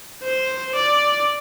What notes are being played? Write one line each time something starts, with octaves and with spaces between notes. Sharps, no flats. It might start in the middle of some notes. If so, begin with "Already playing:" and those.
C5
D5